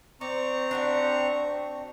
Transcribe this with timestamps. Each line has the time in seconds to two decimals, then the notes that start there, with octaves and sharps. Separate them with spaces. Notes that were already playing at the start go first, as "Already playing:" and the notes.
0.21 C4 D5 A#5 C#6
0.71 D4 F#4 G4